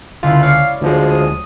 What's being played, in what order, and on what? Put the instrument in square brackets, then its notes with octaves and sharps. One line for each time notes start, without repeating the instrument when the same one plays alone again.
[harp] C#2 D3 E4 [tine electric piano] F4
[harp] C#5 D5 [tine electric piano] F5
[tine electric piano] D2 F3 G#3
[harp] D#6